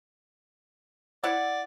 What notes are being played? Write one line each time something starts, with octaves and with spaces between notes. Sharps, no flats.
E4 D5 F#5